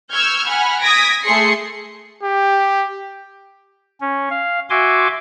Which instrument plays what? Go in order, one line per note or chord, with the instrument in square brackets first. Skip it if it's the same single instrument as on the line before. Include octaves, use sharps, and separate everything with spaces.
[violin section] C#6 E6 F6 G6 G#6
F#5 G#5 B5 F6
D#6 G#6 A#6 B6 D7
A3 G#4 C6 C7 C#7
[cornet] G4
[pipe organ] C#4
F5
F#4 E5 G#5 C6 D6